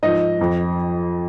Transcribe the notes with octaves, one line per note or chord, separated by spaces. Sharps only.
G#2 F3 D#5
F2 F3